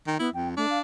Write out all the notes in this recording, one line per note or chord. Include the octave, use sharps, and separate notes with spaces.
D#3 G5
B3 E4
F2 G5
A3 D4
F5